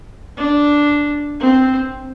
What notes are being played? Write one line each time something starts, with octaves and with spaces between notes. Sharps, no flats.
D4
C4